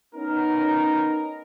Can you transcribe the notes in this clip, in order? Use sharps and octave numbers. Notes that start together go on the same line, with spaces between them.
B3 C#4 D#4 A#4